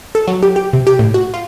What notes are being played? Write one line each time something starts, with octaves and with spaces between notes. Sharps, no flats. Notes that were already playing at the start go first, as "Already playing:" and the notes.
A4
F#3
G4
G4
C3
G4
A2
F#4
F4